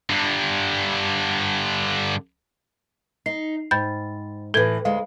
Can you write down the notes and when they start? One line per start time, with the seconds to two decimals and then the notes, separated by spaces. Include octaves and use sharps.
0.10 G2 D3
3.26 D#4 C7
3.71 G#2 G5 B5 G6 A6
4.54 A2 E3 A4 G#6
4.85 D2 G#3 F5